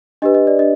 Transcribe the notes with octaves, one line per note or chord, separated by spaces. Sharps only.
D4 G4 B4 D#5
D#5
D5
D4 D#5